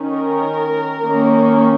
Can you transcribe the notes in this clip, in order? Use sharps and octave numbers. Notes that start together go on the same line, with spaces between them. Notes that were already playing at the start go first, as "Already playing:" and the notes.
Already playing: D#3 C#4
A#4
D#3 A#3 C#4